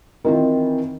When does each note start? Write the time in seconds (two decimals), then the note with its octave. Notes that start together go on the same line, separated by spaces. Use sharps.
0.24 D#3 E3 C4 E4 F4